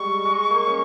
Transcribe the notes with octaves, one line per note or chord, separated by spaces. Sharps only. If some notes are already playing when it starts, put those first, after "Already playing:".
Already playing: G3 G#3 C#6
G#3
A#3
C#4